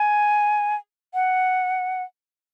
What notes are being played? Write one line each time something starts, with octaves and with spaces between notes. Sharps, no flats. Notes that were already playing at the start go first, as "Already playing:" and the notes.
Already playing: G#5
F#5